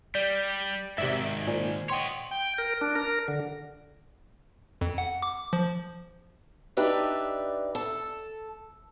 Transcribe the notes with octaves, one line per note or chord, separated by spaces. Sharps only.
G3 D5 G6
G#2 C3 D#3 D5 E5
A#2 C5 D5 G#5
C#5 D#5 F#5 G5 C6
G5
A#4
D4
A#4
D3
F2
F#5
D6
F3
D4 D#4 G4 B4 D5 E5
A4